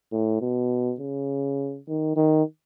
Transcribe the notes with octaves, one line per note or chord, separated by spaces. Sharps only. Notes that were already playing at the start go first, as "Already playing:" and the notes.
A2
B2
C#3
D#3
D#3